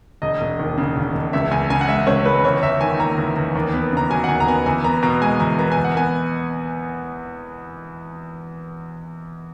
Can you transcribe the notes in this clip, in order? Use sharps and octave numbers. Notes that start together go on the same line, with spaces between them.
E1 D#5
E1
D#2
C#3
E1
E1
C#2 E5
C#2 G#5
C#3 G#5
F#5
G#3 E5
C#2 C#5
C#2 B4
E2 C#5
E2 E5
D#3 G#5
A#3 A#5
E2
E2
D#2
B3
C#3 A#5
F#3 G#5
F#5
D#2 G#5
A#5
B3 G#5
E2 G#5
B3 A#5
B2 A#5
G#3 G#5
E2 A#5
B3 A#5
G#5
E2
F#5
B3 G#5